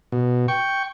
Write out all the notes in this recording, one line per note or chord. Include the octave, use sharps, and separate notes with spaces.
B2
G5 C#6